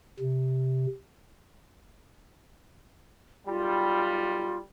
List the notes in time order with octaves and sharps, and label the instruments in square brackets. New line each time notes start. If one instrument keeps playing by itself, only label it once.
[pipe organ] C3
[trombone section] B1 G3 [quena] F4